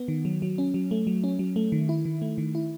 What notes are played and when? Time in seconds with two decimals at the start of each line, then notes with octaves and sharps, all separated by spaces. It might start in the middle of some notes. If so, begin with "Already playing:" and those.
Already playing: B3
0.08 D#3
0.25 F#3
0.42 F#3
0.58 C#4
0.74 F#3
0.91 A3
1.07 F#3
1.24 C#4
1.39 F#3
1.56 A3
1.72 D#3
1.89 E4
2.05 D#3
2.22 A3
2.38 D#3
2.55 E4